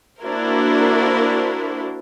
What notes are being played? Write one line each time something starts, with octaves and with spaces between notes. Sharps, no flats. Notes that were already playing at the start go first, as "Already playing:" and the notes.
A#3 D4 E4 F#4 A#4 C5